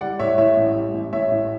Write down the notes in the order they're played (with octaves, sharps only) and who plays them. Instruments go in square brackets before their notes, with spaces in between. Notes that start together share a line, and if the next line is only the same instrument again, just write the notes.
[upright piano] G3 D5 F#5
A2 C#5 E5
A2 C#5 E5
A1
G3
A1
A1 C#5 E5
A2